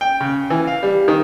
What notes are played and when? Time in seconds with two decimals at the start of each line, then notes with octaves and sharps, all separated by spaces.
0.01 G5
0.21 C#3
0.50 E3
0.67 F5
0.83 G3
1.08 D#3